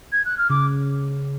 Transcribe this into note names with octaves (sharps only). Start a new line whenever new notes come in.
G#6
F#6
F6
C#3 D6